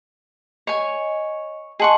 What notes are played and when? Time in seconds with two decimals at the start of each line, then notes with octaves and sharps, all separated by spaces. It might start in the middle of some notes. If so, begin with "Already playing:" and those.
0.67 C#5 D#5 G#5
1.80 G#4 D#5 F#5 A5 C6 C#6